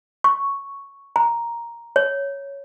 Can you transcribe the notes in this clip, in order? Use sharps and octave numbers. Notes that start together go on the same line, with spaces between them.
C#6
A#5
C#5